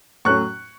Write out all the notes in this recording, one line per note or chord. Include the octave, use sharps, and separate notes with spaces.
A2 F#3 A3 C#4 C#6 F#6